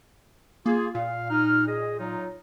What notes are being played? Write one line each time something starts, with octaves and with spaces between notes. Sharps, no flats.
A#3 F4 G#4
A#2 F5
D#4 F6
G#4 D#5
F#3 D#4 F4